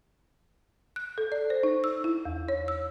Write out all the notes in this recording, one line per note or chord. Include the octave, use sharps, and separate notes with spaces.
F#6
A4
D5
C5
D#4
E6
E4
E2
C#5
E6